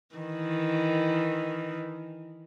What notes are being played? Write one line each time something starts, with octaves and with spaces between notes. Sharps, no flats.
D#3 E3